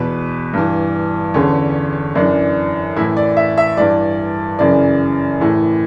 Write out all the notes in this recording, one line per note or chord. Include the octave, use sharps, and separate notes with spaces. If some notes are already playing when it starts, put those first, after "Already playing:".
Already playing: E2 B2 B4
G2 E3
E2 D3 C#4
F#2 E3 D4
A2 E3 E4
D5
E5
E5
G2 E3 D5
F#2 C#3 E3 D5
A2 E3